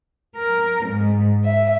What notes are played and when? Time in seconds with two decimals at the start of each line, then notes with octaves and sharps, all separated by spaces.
0.36 A#4
0.85 G#2
1.43 E5